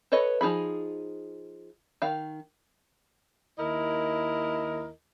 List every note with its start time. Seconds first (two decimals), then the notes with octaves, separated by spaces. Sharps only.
0.12 A4 B4 C#5 D#5
0.41 F3 D#4 G#4 B5
2.02 D#3 F5
3.59 D#2 E4 A#4 D#5